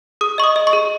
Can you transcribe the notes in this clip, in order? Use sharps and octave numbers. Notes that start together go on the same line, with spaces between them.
G#4 D#6
D#5 C#6
D#6
D#5
C#6
G#4